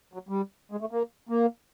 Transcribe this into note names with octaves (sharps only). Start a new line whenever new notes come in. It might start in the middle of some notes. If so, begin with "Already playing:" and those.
F#3
G3
G#3
A3
A#3
A#3